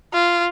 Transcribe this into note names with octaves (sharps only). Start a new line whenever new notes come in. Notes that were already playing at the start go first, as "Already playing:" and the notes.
F4